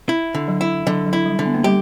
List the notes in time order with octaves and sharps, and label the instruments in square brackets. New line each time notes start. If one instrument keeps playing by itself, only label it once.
[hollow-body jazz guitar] E4
D3
[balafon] F#3
[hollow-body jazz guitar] E4
[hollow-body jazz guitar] D3 [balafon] F#3
[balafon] F#3
[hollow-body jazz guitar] E4
[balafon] G3
[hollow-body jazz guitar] D3
[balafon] B3
A#3
[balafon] G3 [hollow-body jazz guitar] G4